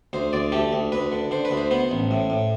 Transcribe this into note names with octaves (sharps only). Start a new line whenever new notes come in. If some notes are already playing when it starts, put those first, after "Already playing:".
D2 C5
D2 D5
A3 G4
D2
D2 B4
D3
D3 C5
B4
D2
C5
B3 C5
A1
A2
A2